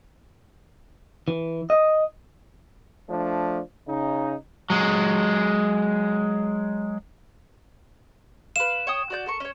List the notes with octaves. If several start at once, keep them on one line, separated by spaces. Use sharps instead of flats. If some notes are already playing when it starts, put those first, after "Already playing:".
E3
D#5
F3 A3 D4
C#3 D#4
F#3 G#3
B4 F5 E7
C#5 G5 D#6
F#4 D5 G6
A4 A#4 C#6
C#4 C#5